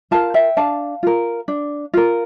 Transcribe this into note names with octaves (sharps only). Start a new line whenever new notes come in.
F4 A#4 F5 A5
E5 G5
D4 F5 A5
F4 A#4
D4
F4 A#4